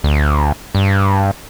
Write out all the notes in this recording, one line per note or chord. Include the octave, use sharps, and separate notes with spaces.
D2
G2